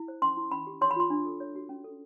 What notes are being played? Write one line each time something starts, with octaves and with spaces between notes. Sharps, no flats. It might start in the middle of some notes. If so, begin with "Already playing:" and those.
Already playing: E4
C5
C#4 C6
E4
C#4 B5
G4
C#5 C6
B5
F4 C6
D4
A4
C#5
F#4
C#4
A4